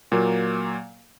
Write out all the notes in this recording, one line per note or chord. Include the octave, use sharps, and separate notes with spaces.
A#2 F#3 A#3